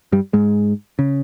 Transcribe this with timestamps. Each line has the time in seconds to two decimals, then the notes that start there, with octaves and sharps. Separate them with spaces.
0.12 G2 G3
0.33 G#2 G#3
0.99 C#3